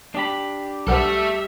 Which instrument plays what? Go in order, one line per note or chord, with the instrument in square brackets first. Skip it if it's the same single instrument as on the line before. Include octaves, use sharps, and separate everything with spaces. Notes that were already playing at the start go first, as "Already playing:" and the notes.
[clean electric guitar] D4 G4 B5
[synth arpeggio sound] B1 A#4 F#5 [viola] G3 E5 [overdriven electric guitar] A3 A4